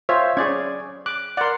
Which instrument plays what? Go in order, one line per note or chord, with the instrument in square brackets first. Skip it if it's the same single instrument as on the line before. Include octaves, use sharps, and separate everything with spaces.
[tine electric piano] F4 C#5 E5 [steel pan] C5
[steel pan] C#4 C#5 [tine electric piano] G#4 D5 G#6
[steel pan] D6 [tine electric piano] F#6
[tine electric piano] A#4 D5 [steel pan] F#5 C6